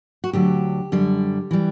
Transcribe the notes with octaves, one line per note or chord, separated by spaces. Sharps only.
F#4
D2 D3 F#3 G4
F#2 D3 G3
E3 G3